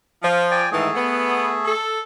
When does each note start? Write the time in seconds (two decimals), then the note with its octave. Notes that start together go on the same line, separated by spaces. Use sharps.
0.21 F3
0.51 D5 G5 G#5
0.71 G#2 D#3 E3 A3 G#4
0.94 B3
1.64 A4